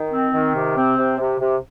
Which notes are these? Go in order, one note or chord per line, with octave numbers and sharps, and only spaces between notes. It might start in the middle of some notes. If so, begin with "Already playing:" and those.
Already playing: D#3
C4
D#3
C3
C4
C3
C3
C3